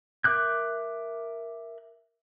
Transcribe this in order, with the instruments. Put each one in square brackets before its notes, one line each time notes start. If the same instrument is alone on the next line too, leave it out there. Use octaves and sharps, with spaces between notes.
[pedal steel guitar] A#4 E5 D6 F#6 G6